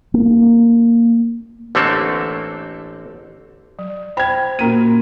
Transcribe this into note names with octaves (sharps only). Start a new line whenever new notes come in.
A#3
A1 D3 A3 A#3 C4 A4
F#3
C5 G5 B5 G#6
A#2 A#3 C#4 F#4 A#4 D#7